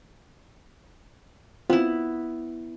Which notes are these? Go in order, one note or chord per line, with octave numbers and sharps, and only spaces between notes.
B3 C4 E4 F4